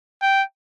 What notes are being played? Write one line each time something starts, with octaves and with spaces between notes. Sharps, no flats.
G5